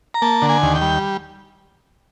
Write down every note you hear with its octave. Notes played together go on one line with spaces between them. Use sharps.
A#5
A#3 A5
D3
G#5
D#2
G5
G3